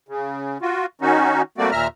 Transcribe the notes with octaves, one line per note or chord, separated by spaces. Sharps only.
C#3
F4 F#4
D#3 C#4 D#4 F#4
G3 A3 A#3 C4 F#4 D5
D#2 A#2 E5 A#5 F6